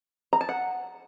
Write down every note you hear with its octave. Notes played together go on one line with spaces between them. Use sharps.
A#5
A5
F#5